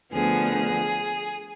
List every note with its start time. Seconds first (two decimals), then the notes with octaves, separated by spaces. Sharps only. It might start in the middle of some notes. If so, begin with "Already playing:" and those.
0.13 D2 D3 F3 B3 G#4
0.56 G#4